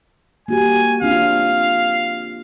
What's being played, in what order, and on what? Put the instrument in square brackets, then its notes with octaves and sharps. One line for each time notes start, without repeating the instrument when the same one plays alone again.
[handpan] A#3 F#4 G4 [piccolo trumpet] G#5
[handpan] C4 D4 F4 [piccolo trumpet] F5